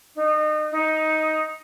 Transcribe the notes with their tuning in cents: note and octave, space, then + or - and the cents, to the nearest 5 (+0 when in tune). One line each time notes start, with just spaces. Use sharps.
D#4 -30
D#4 +10